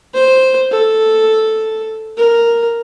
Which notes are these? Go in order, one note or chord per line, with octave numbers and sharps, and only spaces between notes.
C5
A4
A#4